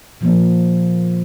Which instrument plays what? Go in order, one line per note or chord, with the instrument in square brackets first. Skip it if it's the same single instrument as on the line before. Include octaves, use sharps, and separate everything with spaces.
[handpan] A#2 F3 A#3